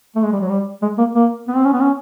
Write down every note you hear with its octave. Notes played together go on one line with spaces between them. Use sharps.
A3
G#3
G3
F#3
G3
G#3
A#3
A#3
B3
C4
C#4
B3
C#4